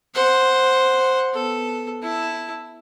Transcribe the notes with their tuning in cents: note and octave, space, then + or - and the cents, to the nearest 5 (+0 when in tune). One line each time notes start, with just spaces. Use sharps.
C5 +0 F#5 -5
B3 +0 A4 +0
E4 +0 A5 +0